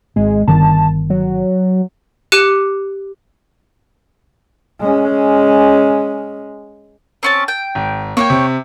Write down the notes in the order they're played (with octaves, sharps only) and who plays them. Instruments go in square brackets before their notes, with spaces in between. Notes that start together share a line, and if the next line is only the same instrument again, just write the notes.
[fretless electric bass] G#1 [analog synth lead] G#3
[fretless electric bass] G1 D#3 [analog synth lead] A5
[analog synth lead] F#3
[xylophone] G4 D6 F#6 C#7 D#7
[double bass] G#3 C#4
[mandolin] C4 C#4 A5
G5
[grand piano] G#1
[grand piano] A#3 [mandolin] C#5 F#5 G5
[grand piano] C3